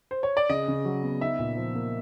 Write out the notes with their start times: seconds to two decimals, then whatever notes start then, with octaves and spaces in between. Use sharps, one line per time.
0.11 C5
0.23 C#5
0.37 D5
0.49 C#3 D#5
0.68 C#3
0.85 F#3
1.03 B3
1.21 D#4 E5
1.39 A#2
1.57 F3
1.75 A#3